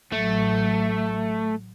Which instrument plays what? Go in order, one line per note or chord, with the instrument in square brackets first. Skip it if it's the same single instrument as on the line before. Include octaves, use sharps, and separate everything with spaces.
[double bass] A1 F#3 [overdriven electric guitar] A3